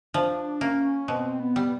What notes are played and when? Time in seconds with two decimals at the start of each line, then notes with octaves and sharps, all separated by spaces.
0.14 F3 D4
0.61 A#3 C#4
1.08 B2 C4
1.39 B3
1.56 G3